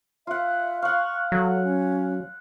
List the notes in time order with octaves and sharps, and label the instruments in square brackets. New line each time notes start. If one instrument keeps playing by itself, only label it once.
[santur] F4 F#5 [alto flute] E5
[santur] F5 F#5 [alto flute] C#6
[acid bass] F#3 [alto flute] A4
[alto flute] C#4